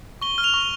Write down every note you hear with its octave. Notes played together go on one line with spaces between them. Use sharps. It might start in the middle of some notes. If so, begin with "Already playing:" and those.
C#6 G7
F6
F7 G7
C#6